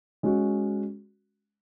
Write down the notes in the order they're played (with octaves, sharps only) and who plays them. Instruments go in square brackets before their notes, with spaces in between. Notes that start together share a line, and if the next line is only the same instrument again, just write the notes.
[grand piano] G#3 C#4 F#4